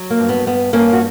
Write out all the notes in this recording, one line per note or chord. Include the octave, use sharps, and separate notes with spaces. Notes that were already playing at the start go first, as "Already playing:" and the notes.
Already playing: F#3
A#3
G2
B3
G2 B3
G2 A#3 C#4
F#4